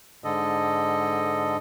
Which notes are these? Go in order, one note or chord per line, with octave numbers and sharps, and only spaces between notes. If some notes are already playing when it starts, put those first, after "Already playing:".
G#2 D3 A4 D#5